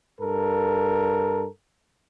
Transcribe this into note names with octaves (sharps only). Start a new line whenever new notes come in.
G2 A4 A#4